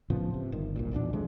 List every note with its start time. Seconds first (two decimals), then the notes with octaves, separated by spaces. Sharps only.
0.10 A2 C#3 F3 B3
0.34 C3
0.52 G1 D#3
0.76 B1 G2 A#2
0.91 A#1 E2 B2 D4
1.13 C3 F3 G#3 A3